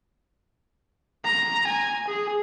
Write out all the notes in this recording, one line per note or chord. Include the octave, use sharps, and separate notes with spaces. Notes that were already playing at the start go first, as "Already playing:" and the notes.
A#5
G#5
G#4